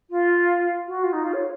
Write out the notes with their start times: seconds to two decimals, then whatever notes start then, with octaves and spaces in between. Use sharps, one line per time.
0.10 F4
0.87 F#4
1.03 F4
1.12 D#4
1.23 F4
1.33 C#5